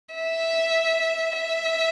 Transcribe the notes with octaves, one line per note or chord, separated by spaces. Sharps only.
E5
E5